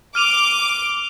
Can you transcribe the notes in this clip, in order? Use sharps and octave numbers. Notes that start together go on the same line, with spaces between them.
D6 F6 D#7 F7